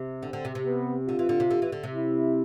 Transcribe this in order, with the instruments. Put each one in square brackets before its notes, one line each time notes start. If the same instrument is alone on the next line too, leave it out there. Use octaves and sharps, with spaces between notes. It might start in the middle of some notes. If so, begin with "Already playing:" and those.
Already playing: [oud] C3
[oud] D3 [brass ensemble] C4
[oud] D3
C3
C3
[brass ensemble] B3
[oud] D3 [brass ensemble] F4
[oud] E3
D3
C3
D3
E3
D3
C3
[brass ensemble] E4